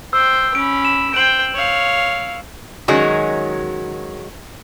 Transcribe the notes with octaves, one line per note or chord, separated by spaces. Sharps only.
C5 G5 E6
C#4 B5 D7
E7
C5 G5 D7 F#7
C#5 F5
D#3 F#3 G#3 C#4 F#4